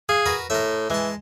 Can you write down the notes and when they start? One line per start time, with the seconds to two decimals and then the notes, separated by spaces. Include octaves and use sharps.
0.09 G#4 F5
0.26 F#4 A#4 B4
0.50 A2 A#4 E5
0.90 E3 G#3 A5